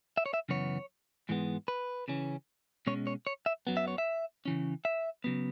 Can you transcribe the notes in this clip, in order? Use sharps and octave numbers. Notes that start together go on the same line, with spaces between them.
E5
C#5
E5
F#2 C#3 E3 B3 C#5
G#2 E3 G#3 B3
B4
C#3 E3 C#4
B2 G#3 C#4 C#5
C#5
C#5
E5
F#2 F#3 B3
E5
C#5
E5
C#3 E3 C#4
E5
C#3 F#3 B3